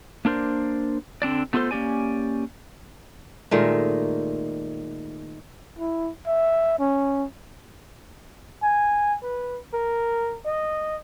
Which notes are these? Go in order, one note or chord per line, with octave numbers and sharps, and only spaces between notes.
A#3 D4 A#4 C5 D5
D3 C4 D4 D5
A3 B3 F4 G#4 A4 C5
A#3 C#4 G4 D5 G#5
A#2 D#3 G#3 A3
E4
E5
C#4
G#5
B4
A#4
D#5